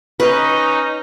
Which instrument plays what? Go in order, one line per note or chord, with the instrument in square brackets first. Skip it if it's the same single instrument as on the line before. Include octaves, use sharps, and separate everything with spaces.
[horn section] C#4 D#4 [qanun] B4